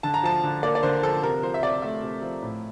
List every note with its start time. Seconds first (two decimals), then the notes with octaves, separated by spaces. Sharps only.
0.03 D3 A5
0.14 A#5
0.23 F3 A5
0.44 D3
0.63 A#3 D5
0.75 D5
0.83 D3 C5
1.03 F3 A4
1.23 C3 A#4
1.43 F3 C5
1.54 E5
1.63 C3 D5
1.82 A3 E5
2.03 C3
2.22 F3
2.43 A2